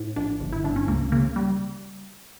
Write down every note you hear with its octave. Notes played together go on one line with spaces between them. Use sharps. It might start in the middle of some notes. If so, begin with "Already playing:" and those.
Already playing: A2
A#1 D4
G1
E4
G1 D4
C#4
C#2 A#3
C#3 A#3
G3